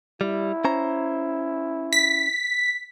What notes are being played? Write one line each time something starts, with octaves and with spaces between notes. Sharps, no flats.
G3 E4
C#4 C5 A#5
B6